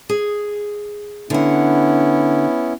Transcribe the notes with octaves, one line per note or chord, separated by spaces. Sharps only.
G#4
D3 B3 C#4 E4 F#5